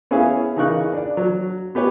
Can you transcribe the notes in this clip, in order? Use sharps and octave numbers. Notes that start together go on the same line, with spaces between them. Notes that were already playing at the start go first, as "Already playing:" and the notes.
B3 C#4 E4 G#4 E5 F5
C#3 E3 D#4 A#4 C#6 F#6
D4 D5
F#3
B3 G4 B4 C#5